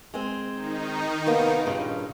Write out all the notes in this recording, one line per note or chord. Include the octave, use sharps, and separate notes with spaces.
G#3 C4
D#3 D#4
C3 A#3 B3
G2 A#2 C#3